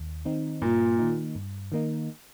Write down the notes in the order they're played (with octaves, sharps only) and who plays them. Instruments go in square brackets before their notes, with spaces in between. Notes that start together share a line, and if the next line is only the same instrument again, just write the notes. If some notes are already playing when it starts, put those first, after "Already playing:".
Already playing: [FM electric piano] D#2
D#3 C4 D#4
[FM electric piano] G2 [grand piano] A#2
[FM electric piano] D#3 A#3 D#4
G2
D#3 A#3 D#4